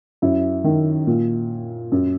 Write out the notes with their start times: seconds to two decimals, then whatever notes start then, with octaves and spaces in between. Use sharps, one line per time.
0.22 F#2 E4
0.64 D#3
1.07 A#2
1.92 F#2